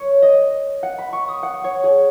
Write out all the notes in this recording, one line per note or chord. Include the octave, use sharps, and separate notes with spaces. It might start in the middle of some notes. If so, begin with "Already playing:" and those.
Already playing: C#5
D#5
F#5
B5
C#6
D#6
F#5
C#5
G#4